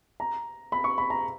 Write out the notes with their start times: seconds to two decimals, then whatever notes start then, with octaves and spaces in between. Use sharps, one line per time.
0.20 A#5
0.72 B5
0.84 C#6
0.98 B5
1.10 A#5